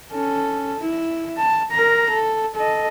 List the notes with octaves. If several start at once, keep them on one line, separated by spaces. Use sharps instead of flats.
C#4 A4
E4
A5
A#4 A#5
A4
A4 D#5